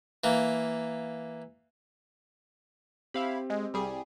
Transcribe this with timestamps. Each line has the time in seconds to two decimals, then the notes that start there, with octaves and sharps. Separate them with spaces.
0.24 E3 A#3
3.14 C4 E4 G4 F5 B5
3.50 G#3
3.74 C2 G3 G#4